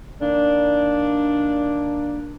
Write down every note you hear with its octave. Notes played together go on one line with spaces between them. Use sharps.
D#3 A#3 D4